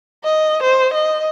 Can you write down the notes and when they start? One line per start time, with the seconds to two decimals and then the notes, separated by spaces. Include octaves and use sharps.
0.24 D#5
0.63 C5
0.94 D#5